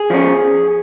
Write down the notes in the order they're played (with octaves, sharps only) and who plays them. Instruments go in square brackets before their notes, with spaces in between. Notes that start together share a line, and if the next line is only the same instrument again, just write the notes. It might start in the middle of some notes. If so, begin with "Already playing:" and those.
Already playing: [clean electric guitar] G#4
F3 C#4